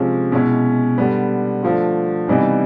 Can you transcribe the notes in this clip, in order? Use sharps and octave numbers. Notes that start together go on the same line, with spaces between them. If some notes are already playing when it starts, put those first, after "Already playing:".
Already playing: C3 F3 G#3 C#4
B2 G#3 C#4 E4
D3 G3 B3
D3 F3 A3
C3 E3 G3 B3 D#4